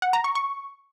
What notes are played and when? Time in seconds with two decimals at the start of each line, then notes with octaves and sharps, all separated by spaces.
0.02 F#5
0.13 A#5
0.24 C#6
0.35 C#6